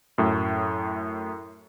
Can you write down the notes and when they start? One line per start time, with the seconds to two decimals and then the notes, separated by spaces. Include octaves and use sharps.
0.18 F#2 A2